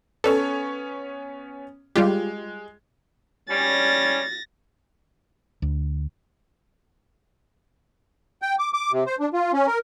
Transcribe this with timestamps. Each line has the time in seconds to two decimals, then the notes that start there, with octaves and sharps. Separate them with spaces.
0.24 B3 C#4 A4 C#5
1.96 G3 G#3 F4 G4
3.50 G3 C#4 A6 A#6
5.62 D2
8.42 G5
8.59 D6
8.73 D6
8.92 C3
9.06 C5
9.20 D4
9.33 F4
9.53 C#4
9.67 A#4